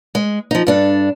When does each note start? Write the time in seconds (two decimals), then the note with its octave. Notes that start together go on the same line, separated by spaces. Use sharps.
0.15 G#3
0.51 F3 D#4
0.67 G2 D4 A4